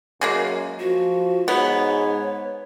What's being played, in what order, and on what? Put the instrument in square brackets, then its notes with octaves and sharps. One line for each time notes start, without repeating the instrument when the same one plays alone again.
[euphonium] F#2 [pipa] C#3 G#3 A#3
[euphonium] F3 [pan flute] F#4
[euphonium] G#2 [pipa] B3 [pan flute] C#5